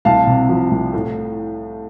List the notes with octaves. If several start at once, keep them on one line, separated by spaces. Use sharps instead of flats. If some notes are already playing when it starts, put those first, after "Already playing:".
C2 F5 A5
C3
F3
C2
A2